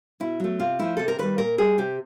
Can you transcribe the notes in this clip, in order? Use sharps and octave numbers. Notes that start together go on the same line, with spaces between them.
B2 E4
F#3 A3
C3 F4
F3 A3 E4
C3 A4
A#4
D#3 G3 B4
A#2 A#4
G3 G#4
C3 G4